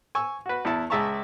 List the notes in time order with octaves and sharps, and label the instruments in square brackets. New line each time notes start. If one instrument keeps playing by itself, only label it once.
[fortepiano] G#5 C#6 E6
F#4 B4
E2 E4 A5
C#2 G#4 E5 A5 A#5 C#6